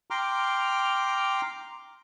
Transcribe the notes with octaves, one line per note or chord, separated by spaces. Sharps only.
G5 A#5 C6 D6 F6